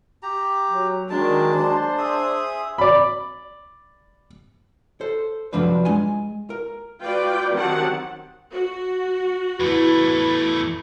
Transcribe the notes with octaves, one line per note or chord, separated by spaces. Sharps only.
G4 A#5
F#3
D#3 F#3 G#3 A#3 D4 A5
D4 C5
G#4 E5 D#6
D5 B5
A4 C5
C2 F#2 F3 D4 B4 C5
G#3 G#5
A#4
F4 F#4 B4 D5 G5
D#3 F#3 C4 G4 F#5 A5
F#4
E2 A3 E4 B4